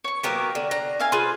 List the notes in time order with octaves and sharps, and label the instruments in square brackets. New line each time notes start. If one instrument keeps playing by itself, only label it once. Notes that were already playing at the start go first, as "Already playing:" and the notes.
[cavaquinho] C#5 C#6
[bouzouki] F#3 A#3 B3 [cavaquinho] G4 A#4 C#5
[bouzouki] D3
D4 A#5
[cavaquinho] E5 F5 G#5
[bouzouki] F4 G#4 [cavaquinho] B4 C5